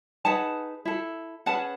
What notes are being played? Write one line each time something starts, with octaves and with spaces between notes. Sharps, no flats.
D#4 G#4 B4 F#5 A5
E4 A4
C#4 G#4 B4 F#5 A5